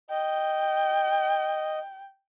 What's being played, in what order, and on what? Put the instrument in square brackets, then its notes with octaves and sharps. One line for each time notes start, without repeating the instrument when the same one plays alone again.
[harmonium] D#5 [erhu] G5